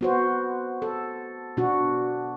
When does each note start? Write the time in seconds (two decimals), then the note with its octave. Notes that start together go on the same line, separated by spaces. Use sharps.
0.01 B3 F#4 C5
0.82 A4
1.57 B2 D4 F#4